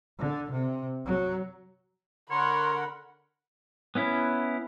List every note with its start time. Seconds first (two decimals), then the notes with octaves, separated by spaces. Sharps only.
0.18 D3
0.51 C3
1.05 F#3
2.30 D3 A#4 C#5 F#5 B5 C6
3.95 B3 C#4 E4